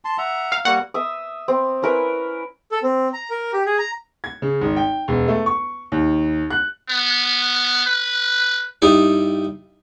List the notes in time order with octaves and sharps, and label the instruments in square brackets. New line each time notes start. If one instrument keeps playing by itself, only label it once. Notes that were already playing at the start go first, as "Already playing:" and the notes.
[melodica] A5 C6
E5 F#5 A#5
[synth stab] F5
[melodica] G3 A#3 F#4 [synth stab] F#5
[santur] E5 D#6
C4
C#4 E4 A#4 B4
[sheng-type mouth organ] A4
C4
A#5
A#4
G4
G#4
A#5
[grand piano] G#6
C#3
G#1
G5
E1
A3
C#6
D#2
F#6
[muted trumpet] B3
B4
[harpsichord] G2 D#4 E4 D5